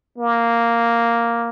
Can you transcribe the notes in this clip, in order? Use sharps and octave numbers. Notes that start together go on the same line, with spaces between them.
A#3